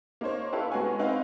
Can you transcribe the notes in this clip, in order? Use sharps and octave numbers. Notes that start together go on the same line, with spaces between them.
A#3 D#4 C5 C#5
E4 G4 A4 B4 F5
G#3 B3 F#4 G#5 C#6
C4 D#4 B4 C#5 F5